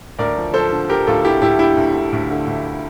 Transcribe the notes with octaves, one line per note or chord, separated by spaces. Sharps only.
D2 A#4 D5
F3
F3 A4 C5
D3
D3 G4 A#4
D2 F4 A4
D3 E4 G4
D2 E4 G4
D3 E4 G4
D2
D3
D2
D3
D2